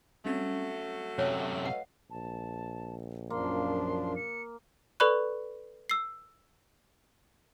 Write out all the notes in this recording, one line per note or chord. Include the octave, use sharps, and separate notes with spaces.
F#3 G3 A3 C4 C#4
F#2 C3 C#5 G5 F6 F#6
B4 D#5 F5 F#5
A#1 A5
F#2 F3 A#3 D4 C6
C#7
A4 B4 D5 B5 C#6 F#6
E6 C7